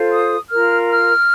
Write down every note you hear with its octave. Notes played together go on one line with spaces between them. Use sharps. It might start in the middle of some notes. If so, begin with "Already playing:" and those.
Already playing: F4 A4 C5
D#6
F4 A#4 F6
F6